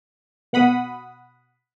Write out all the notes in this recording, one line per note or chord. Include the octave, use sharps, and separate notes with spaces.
B2 F#5 B5 D#6